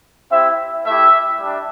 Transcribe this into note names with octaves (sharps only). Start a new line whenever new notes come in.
C4 E4 G4 E5
A3 E4 G4 E5
G3 D4